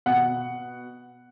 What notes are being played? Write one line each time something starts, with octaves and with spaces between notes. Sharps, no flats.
B2 F#5